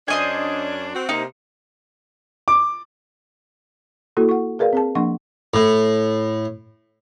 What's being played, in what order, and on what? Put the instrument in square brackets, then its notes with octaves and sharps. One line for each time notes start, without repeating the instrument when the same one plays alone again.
[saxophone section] F#2 C#4 D4 [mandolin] C5 D#5 G#5
[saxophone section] C4 F#4
[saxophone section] C3 A#3 [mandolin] D#4
[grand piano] D6
[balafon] A#3 E4 F#4 A4
F#5 C#6
G#4 A#4 B4 D5 F5
C4 G#4 A5
F3 A#3 D4 F#5 C6 C#6
[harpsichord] A2